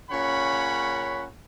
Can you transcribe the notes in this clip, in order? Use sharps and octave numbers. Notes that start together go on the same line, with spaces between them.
A#2 C#3 C#4 C#5 F#5 B5